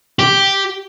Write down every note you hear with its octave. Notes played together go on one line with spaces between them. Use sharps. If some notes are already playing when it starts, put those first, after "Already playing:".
G4